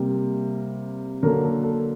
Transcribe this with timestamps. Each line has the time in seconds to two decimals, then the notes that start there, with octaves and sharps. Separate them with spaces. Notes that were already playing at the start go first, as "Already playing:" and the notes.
Already playing: C3 G3 A#3
1.23 D3 F#3 A#3 A#4
1.43 A4
1.63 A4